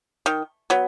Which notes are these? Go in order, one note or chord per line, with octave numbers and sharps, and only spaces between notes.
D#3
F#3 B3